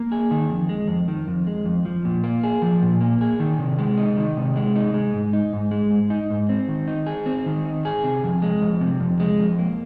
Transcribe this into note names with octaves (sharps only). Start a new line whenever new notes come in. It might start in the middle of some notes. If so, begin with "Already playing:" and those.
Already playing: A#3
G#4
D#3
F2
G#3
F2
D#3
F2
G#3
F2
F3
A#2
A#3
G#4
F3
A#2
A#3
G#4
D#3
C3
G#3
D#4
D#3
C3
G#3
D#4
G#3
G#2
D#4
G#2
G#3
G#2
D#4
G#2
C4
D#3
D#4
G#4
C4
D#3
D#4
G#4
C3
F2
G#3
F2
C3
F2
G#3
F2
A#3